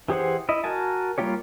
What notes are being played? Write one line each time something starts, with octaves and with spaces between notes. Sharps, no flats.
E3 G4 G#4 C5 F#5
E4 D#5
F#4 A#4 G#5 A5
G3 A#3 F4 G4 C#5